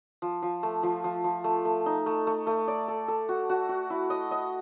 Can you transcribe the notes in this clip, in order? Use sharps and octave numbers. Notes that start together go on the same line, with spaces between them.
F3
F3
A3
F3
F3
F3
A3
A3
D#4
A3
A3
A3
D5
A4
A4
F#4
F#4
F#4
E4
D#5
D#5